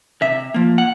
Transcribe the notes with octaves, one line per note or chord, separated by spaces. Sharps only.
C3 E5
F3 A#3
F#5